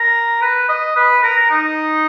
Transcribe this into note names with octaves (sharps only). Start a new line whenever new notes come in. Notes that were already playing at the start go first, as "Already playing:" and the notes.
Already playing: A#4
B4
D#5
B4
A#4
D#4